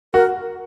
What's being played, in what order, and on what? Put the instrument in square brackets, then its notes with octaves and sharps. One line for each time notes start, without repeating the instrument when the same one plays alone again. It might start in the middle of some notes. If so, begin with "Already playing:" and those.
[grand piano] F#4 [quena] A#4